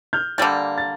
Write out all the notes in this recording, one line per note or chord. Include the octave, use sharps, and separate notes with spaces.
F6 G6
D3 G3 A#3 G6 A6
A6